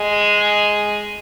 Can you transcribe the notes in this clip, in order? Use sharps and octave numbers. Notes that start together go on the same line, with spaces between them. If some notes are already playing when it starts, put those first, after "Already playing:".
Already playing: G#3